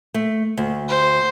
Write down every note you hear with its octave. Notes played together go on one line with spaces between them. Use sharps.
A3
D2
C5